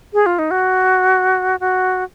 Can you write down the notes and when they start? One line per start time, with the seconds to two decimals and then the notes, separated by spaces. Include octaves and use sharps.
0.14 G#4
0.26 F4
0.39 D#4
0.51 F#4
1.60 F#4